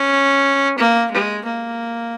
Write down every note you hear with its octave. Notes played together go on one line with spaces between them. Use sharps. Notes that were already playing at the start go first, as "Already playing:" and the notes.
Already playing: C#4
A#3
G#3
A#3